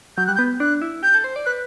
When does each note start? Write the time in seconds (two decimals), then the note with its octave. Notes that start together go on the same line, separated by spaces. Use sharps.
0.17 F#3 G6
0.27 G3 F#6
0.35 G6
0.39 B3
0.60 D4 F#6
0.82 E4
1.03 G4 G6
1.14 A4
1.24 C5
1.36 D5
1.46 B4 F#6